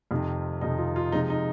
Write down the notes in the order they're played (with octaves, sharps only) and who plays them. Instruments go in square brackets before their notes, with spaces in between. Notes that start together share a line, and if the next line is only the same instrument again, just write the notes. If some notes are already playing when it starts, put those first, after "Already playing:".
[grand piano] F2 C3 D#3
F2 C3 D#3 D#4
F4
F4
C3 F3 G#3 D#4
D#4